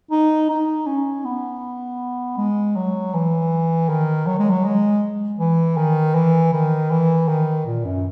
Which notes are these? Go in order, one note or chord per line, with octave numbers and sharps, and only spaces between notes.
D#4
D#4
C#4
B3
G#3
F#3
E3
D#3
F#3
G#3
F#3
G#3
E3
D#3
E3
D#3
E3
D#3
A#2
F#2